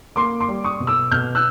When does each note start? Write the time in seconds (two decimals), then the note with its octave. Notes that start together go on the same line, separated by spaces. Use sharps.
0.16 A#3 C6 D6
0.40 C6 D6
0.49 G3
0.64 C#6 D#6
0.80 B2
0.87 D6 E6
1.11 B2 F6 G6
1.35 E6 F#6